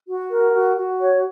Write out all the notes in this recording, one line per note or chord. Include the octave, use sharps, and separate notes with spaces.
F#4
A#4
F#4
F#4
C#5